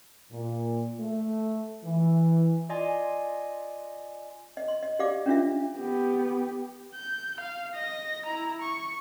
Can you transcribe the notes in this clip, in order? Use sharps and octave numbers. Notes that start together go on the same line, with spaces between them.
A#2
A3
E3
F4 D5 D#5 G#5 C6
D#5
C6
D#5
G4 D5 F5 D6
C#4 D4 F4 E5
B3 G4
G6
F5
D#5 A#6
E4 A#5
C#6